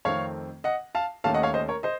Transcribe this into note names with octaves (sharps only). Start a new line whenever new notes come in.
F2 D#3 A3 C4 C#5 F5
D#5 F#5
F5 A5
D#2 D#3 A3 C#4 F5 A5
D#5 F#5
C#5 F5
C5 D#5
A#4 C#5
C5 D#5